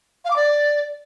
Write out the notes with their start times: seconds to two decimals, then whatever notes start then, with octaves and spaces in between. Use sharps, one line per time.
0.25 F5
0.31 D6
0.36 D5